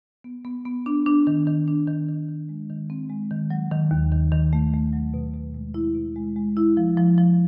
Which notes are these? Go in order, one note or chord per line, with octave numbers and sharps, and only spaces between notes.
B3
B3
B3
D4
D4
D#3
D#3
D4
D#3
D#3
D#3
G#3
D#3
C4
G#3
D#3
F#3
D#3
D#2
D#3
D#3
A3
A3
F#3
B2
B2
G#3
E4
B2
G#3
G#3
E4
F3
F3
F3